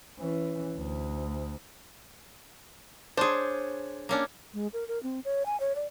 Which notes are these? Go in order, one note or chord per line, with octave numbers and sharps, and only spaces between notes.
E3 C#4
D2
D4 G#4 C5 C#5
A#3 C#4 D4
G#3
A#4
A#4
C4
C#5
G#5
C#5
D5